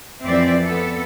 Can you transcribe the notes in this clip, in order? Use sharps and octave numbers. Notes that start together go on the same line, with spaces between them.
F2 E3 C4 D5 E5
B3 A4